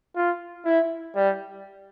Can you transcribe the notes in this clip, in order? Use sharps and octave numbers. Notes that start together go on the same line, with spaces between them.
F4
E4
G3